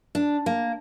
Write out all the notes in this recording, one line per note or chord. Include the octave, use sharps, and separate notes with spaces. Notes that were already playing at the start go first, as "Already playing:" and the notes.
D4
A#3